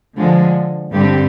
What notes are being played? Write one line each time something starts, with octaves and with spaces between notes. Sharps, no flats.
D3 F3 G#3
G2 D3 G3 C4 G4